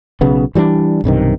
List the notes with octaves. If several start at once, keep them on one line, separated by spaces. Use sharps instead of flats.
B1 C#3 B3
E3 G3 A3 D4
B1 G2 C3 D#3